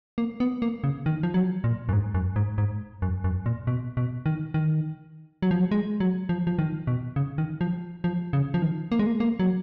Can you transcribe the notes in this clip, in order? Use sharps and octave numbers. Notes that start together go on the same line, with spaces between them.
A#3
B3
A#3
C#3
D#3
F3
F#3
A#2
F#2
G#2
F#2
G#2
G#2
F#2
F#2
A#2
B2
B2
D#3
D#3
F#3
F3
F#3
G#3
F#3
F3
F3
D#3
B2
C#3
D#3
F3
F3
C#3
F3
D#3
A#3
G#3
A#3
A#3
F#3